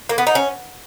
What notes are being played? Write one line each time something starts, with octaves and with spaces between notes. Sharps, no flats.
A#3
B3
D#4
C#4